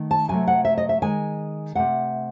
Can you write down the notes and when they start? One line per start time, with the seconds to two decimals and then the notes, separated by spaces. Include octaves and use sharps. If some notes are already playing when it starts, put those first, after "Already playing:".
Already playing: D#3 A3
0.11 A5
0.28 C3 F#3 A3 G#5
0.47 F#5
0.65 E5
0.78 D#5
0.89 E5
1.02 D#3 G#3 G#5
1.75 C3 F#3 A3 F#5